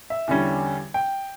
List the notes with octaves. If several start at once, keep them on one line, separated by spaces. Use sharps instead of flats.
E5
E2 D3 G3 C#4
G5